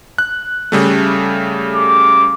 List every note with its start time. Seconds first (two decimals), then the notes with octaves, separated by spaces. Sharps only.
0.18 F#6
0.72 C#3 G3 A3
1.74 D6